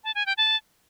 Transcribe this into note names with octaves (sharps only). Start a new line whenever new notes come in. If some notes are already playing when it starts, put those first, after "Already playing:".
A5
G#5
G5
A5